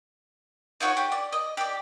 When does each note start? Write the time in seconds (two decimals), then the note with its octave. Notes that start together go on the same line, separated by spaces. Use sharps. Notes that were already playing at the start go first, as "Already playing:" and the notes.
0.80 D#4 F4 F#4 C#5
0.97 G4
1.12 D5
1.32 D#5
1.57 G4 D5